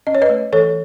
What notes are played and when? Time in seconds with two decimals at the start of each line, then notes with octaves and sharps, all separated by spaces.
0.07 C#4 D#5
0.15 C#5
0.22 B4 D#5
0.29 A3
0.53 E3 A4 C#5